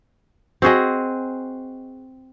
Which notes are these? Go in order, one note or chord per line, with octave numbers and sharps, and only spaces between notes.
C4 F#4 G#4 D#5